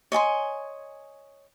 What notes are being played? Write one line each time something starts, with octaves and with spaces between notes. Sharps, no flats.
C#5 D#5 G#5 C6